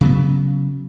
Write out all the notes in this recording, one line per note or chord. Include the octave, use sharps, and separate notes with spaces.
C#3 F#3 B3